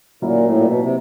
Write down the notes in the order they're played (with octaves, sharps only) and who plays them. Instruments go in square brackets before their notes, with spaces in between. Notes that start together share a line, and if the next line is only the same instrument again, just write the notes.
[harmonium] A#2 [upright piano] F#3 A#3 C#4 E4
[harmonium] A2
A#2
B2
C3